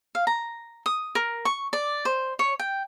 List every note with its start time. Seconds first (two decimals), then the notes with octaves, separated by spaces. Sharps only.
0.15 F5
0.27 A#5
0.86 D#6
1.15 A#4
1.45 C#6
1.73 D5
2.05 C5
2.39 C#5
2.59 G5